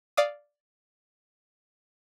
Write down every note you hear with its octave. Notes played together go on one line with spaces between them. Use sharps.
D5 F5 D#6